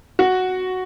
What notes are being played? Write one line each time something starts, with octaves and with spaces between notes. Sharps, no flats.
F#4